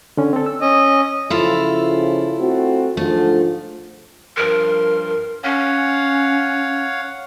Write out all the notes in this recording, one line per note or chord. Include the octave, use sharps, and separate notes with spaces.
D3 C#4
C4 A4
E6
C#4 D#5
C#3 F3 E4 F4 A4
A3 C4 F#4
G#2 D3 F3 A3
G2 F3 A#4 C6
C#4 C#5 F5 F#5